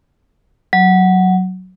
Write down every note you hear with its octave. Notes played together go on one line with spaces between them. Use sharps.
F#3